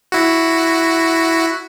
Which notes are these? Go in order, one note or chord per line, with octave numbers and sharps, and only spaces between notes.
E4 F#4